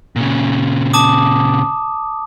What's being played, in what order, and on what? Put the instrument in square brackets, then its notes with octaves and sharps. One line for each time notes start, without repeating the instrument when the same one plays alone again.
[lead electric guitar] A#2 C#3
[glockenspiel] A5 D6 D#6